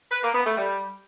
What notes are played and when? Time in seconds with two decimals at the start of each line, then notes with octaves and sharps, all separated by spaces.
0.11 B4
0.23 A#3
0.34 B3
0.46 A3
0.57 G3